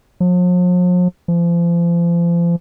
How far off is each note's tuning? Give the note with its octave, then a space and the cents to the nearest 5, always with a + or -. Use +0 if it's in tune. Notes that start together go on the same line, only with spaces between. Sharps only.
F3 +45
F3 -35